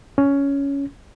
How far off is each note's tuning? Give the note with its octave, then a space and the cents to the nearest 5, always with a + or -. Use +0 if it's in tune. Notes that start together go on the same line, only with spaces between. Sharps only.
C#4 +10